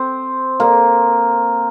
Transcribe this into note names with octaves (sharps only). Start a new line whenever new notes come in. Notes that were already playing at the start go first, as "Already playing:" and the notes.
Already playing: C4
A#3